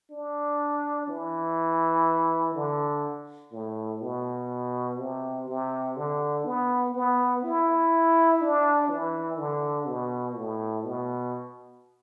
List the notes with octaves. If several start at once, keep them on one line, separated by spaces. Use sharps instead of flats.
D4
E3
D3
A2
B2
C3
C3
D3
B3
B3
E4
D4
E3
D3
B2
A2
B2